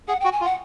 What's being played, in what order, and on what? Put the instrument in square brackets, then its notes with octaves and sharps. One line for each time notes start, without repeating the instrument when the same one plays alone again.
[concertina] G#4 [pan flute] F#5
[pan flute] G5
[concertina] F#4
[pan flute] G#5
[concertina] F4
[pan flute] F#5